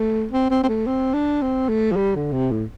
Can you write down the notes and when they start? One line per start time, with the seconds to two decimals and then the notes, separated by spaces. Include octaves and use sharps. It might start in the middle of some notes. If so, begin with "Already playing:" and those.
Already playing: A3
0.32 C4
0.50 C4
0.63 C4
0.68 A3
0.87 C4
1.14 D4
1.42 C4
1.69 A3
1.92 F3
1.96 G3
2.15 D3
2.32 C3
2.51 A2